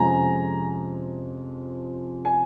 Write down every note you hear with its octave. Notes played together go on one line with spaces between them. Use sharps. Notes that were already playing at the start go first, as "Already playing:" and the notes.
Already playing: F2 C3 F3 G#3 C#4 G#5 A#5
G#5